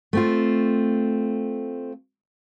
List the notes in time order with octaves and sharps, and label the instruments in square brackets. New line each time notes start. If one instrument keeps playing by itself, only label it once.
[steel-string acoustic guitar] A3 C4 F4